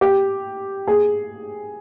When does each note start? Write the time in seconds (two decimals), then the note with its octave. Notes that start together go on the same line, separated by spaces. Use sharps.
0.01 G4
0.87 G#4